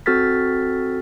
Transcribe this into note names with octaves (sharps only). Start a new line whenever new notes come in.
C4 F#4 A4 F6 A6 B6